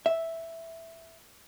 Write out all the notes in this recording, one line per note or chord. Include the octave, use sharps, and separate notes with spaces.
E5